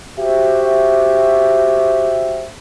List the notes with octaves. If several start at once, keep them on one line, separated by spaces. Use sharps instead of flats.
F#4 G4 C5 E5